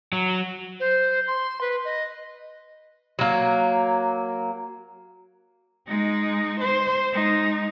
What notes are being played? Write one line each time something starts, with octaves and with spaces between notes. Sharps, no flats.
F#3
C5
C6
B4
D#5
F#3 A#3
G#3 D#4
C5
G#3 D#4